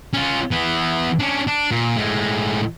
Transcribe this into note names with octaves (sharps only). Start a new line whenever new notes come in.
C#4 F4
E3 B3
C#4 D4
D4
A#2
A2 G#3